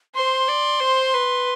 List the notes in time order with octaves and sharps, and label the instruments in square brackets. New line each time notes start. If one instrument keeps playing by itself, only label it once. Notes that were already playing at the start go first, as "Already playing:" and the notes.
[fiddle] C5 [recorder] C6
[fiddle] D5
C5
B4